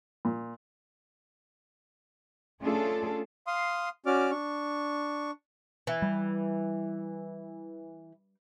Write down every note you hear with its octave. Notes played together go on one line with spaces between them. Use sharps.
A#2
A3 C#4 D4 F4 G#4 A4
F5 C6 D#6
C#4 F#4 D5 D6 F6
D4 C#6
E3
G3